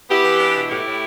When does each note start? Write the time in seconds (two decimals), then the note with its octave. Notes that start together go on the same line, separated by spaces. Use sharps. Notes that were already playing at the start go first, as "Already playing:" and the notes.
0.09 B3 E4 G4
0.25 E3
0.40 D4
0.55 B2
0.70 A2 E4 G4
0.85 A2